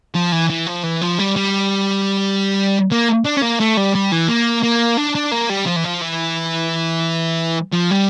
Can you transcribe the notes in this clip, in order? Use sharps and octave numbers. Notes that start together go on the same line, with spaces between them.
F3
E3
E3
F3
E3
F3
G3
G3
A#3
D4
C#4
A#3
A3
G3
G3
E3
A#3
A#3
D4
D4
A#3
G3
F3
E3
F3
E3
F3
G3